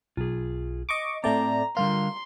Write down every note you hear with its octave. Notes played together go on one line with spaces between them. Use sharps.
B1 F4 G#4
D#5 C#6 D6
A2 A3 C4 D5 A#5
D3 G3 F4 A#4 C6